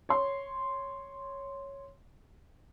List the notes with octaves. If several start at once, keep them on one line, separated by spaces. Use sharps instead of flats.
C#5 C6